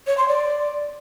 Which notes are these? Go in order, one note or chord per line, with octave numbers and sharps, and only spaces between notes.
C#5
C6
D5